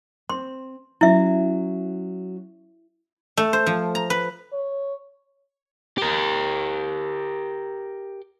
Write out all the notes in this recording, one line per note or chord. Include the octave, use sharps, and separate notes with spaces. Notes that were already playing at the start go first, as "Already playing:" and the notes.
C4 C6
F#3 C#4 E4 E5
A3
C5
F3
A#5
B4
C#5
G4 A#4